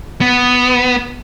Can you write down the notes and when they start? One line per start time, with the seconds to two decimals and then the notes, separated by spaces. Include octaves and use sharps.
0.21 B3